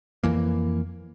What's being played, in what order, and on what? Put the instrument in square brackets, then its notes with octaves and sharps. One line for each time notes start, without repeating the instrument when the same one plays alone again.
[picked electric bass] F2 E3 A#3